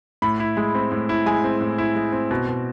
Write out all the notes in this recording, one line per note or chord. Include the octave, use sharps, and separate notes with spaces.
A2 B5
E4
G#3
C4
A2
E4
G#3 G#5
C4
A2
E4
G#3
C4
B2
B2